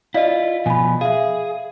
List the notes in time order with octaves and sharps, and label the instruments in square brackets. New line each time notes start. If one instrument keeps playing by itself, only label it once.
[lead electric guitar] E4 F4 [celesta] D5 D#5 F5
[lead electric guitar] B2 F3 [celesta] G#5 B5
[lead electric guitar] G#4 [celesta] E5 F5